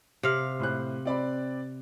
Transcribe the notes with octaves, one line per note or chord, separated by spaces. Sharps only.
C3 F5
A2 C5 F#6
C4 D5 B5